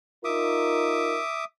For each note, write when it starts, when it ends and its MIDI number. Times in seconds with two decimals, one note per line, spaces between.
0.25 1.20 63
0.25 1.20 65
0.25 1.20 70
0.25 1.45 76
0.25 1.45 86
0.25 1.45 87